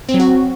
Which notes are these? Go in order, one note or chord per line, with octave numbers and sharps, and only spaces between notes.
C4
F#3
F#4